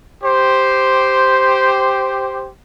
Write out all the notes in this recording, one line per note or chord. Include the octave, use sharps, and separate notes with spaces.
G4 C5